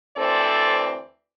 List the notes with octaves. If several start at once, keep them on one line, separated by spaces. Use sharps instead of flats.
D2 E3 C4 A4 C5 D5